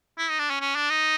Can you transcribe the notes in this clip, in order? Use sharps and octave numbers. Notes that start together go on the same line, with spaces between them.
E4
D#4
D4
C#4
C#4
D4
D#4